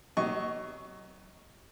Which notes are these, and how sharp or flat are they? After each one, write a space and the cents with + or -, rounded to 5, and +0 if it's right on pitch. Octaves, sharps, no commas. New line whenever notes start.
F#3 +30 D#5 +0 C#6 +0